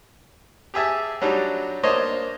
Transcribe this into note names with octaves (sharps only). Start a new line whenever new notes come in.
G4 G#4 E5 A5
F#3 G3 D4 D#4
A#3 D4 C5 C#5 D#5